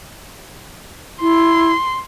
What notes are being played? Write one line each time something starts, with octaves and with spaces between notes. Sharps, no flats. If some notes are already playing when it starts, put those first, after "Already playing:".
E4 C6